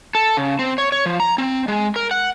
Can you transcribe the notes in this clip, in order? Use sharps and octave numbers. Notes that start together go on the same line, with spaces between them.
A4
C#3
C4
C#5
C#5
F3
A#5
C4
G#3
A#4
F#5